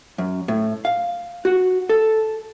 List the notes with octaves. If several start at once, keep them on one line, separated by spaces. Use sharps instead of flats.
F#2
A2
F5
F#4
A4